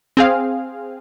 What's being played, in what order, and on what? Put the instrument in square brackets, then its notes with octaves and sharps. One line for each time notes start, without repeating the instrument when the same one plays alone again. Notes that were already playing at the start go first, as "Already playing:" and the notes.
[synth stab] C4 G#4 F5